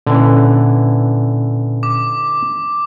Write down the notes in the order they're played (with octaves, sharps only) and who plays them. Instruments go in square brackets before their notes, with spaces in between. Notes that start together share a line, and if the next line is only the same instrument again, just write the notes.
[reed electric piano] A#2 C#4 [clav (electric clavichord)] D3 E3
[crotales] D6